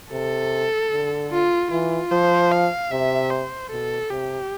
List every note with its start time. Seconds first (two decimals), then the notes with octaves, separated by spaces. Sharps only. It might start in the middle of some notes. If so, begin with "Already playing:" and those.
0.12 C3 A4
0.92 D3
1.31 F4
1.71 E3 F4
2.11 F3 C5
2.51 F5
2.91 C3 E5
3.31 C5
3.71 B2 A4
4.10 C3 G4